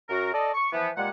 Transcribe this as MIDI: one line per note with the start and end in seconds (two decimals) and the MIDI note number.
0.10 0.33 42
0.10 0.33 66
0.10 0.33 70
0.34 0.51 69
0.34 0.51 74
0.34 0.51 75
0.54 0.69 85
0.73 0.90 52
0.73 0.90 53
0.73 0.90 59
0.97 1.10 46
0.97 1.10 55
0.97 1.10 56
0.97 1.10 78